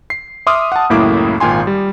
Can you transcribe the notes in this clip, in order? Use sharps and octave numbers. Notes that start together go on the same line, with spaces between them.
C7
E5 C6 D6 D#6 F6
F#5 A5
C#2 F#2 A2 A#3 E4 D6
G#1 A#2 F4 G5 G#5 C6
G3